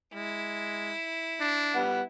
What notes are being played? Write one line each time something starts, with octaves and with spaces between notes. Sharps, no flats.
G#3 E4
D4
G3 B3 F#5